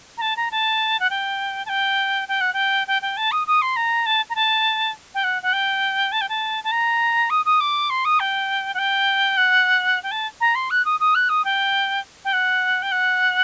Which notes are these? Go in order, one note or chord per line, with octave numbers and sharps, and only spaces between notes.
A#5
A5
A#5
A5
F#5
G5
A5
G5
G5
F#5
G5
G5
G5
A5
D#6
D#6
C6
A#5
A5
A#5
A5
G5
F#5
F#5
G5
A5
G5
A5
A5
A#5
D#6
D#6
D6
C6
D#6
G5
F#5
G5
F#5
G5
A5
A#5
C6
F#6
D#6
D#6
F#6
D#6
G5
G5
F#5
G5
F#5